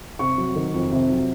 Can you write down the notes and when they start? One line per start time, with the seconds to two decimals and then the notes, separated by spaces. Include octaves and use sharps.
0.19 C3 C#6
0.38 F#3
0.56 D#3
0.74 F2
0.92 C3
1.10 F#3